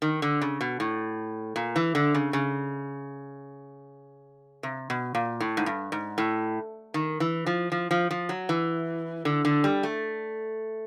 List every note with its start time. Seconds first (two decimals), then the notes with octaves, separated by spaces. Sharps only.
0.02 D#3
0.22 D3
0.41 C#3
0.61 B2
0.80 A2
1.56 A#2
1.76 E3
1.95 D3
2.15 C#3
2.33 C#3
4.63 C3
4.90 B2
5.15 A#2
5.40 A2
5.57 G#2
5.66 G2
5.92 G#2
6.18 A2
6.94 D#3
7.20 E3
7.46 F3
7.72 F3
7.91 F3
8.11 F3
8.29 F#3
8.49 E3
9.25 D3
9.45 D3
9.64 G3
9.83 A3